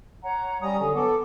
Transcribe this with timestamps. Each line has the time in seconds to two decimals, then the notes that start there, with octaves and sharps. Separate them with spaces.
0.23 C#5 F#5 A#5
0.62 G3 C#4 A#5 D#6
0.79 D3 F#3 C#4
0.95 B3 A4 D6